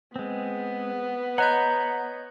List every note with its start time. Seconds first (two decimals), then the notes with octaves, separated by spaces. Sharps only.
0.16 G#3 B3 C4
1.38 C#5 D#5 F#5 A#5 B5 F#6 G6